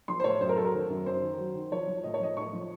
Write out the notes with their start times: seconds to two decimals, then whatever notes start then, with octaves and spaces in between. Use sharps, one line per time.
0.08 F3 C6
0.20 C5
0.24 A2 C#5
0.41 F#2 C5
0.49 A#4
0.57 F#3 A4
0.65 A#4
0.73 D#3
0.90 F#2
1.06 F#2 C5
1.22 D#3
1.38 F#3
1.55 D#3
1.72 F3 C#5
1.87 F3
2.03 A2 D#5
2.14 C#5
2.20 F3 D#5
2.36 A2 C#6
2.53 F3